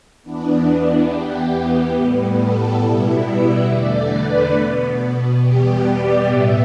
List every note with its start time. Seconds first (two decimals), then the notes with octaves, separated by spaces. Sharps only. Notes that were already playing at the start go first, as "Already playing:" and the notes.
0.22 E2 E3 B3 D4
1.08 E2 E3 B3 G4
1.94 A2 G3 B3
2.37 A4
2.80 B2 G3 B3 E4
3.23 E5
3.66 E2 D3 A3 D5
4.10 B4
4.53 B2 B3
5.38 E2 B2 G3 B3 G4
5.82 D5
6.24 A2 G3 B3 E5